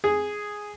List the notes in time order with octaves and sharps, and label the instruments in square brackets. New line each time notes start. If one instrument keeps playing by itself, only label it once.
[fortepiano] G#4